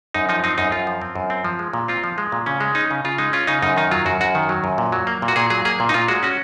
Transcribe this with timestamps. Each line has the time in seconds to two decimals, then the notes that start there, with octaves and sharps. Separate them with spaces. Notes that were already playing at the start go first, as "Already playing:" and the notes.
0.14 F#2 D#4
0.29 F3 D#4
0.44 C4 D#4
0.58 F#2 D#4
0.72 F#2 F4
0.87 F3
1.02 C4
1.16 F#2
1.30 C4
1.44 F3
1.59 G#3
1.73 A#2
1.88 C4 F4
2.04 F3
2.18 G#3
2.32 A#2
2.46 C#3 C#4
2.60 G#3
2.75 C#4 D#4
2.91 C#3
3.05 C#3 F4
3.18 G#3 D#4
3.33 C#4 F4
3.47 C#3 D#4
3.62 F#2 D#4
3.77 D#3 D#4
3.91 F#3 F4
4.06 F#2 F#4
4.21 F#2 F#4
4.35 D#3
4.49 F#3
4.64 F#2
4.78 A#2
4.92 F#3
5.07 A#3
5.22 A#2
5.28 F#4
5.36 A#2 G#4
5.50 F#3 G#4
5.65 A#3 G#4
5.80 A#2
5.89 D#4
5.94 A#2 F4
6.08 G#3 F#4
6.23 C#4 F#4